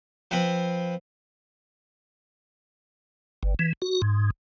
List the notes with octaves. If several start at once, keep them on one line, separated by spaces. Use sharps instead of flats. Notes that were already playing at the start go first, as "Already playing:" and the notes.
F3 C4 B4
G1
E3
F#4
G#2